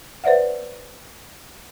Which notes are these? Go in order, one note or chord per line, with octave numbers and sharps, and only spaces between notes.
B4 C5 D5 E5 F#5